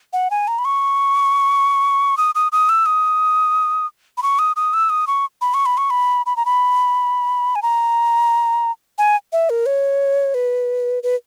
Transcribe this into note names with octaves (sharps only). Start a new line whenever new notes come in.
F#5
G#5
A#5
B5
C#6
D#6
D#6
D#6
E6
D#6
B5
C#6
D#6
D#6
E6
D#6
C#6
B5
C#6
B5
C#6
B5
B5
A#5
B5
G#5
A#5
G#5
E5
A#4
C#5
B4
B4